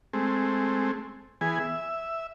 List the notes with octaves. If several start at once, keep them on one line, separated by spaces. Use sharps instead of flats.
G#3 A3 C4
E3 B3 G#4 G#5
E5